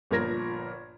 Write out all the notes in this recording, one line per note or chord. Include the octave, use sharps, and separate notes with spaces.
G1 A#2 F3 A#4 G#6 A#6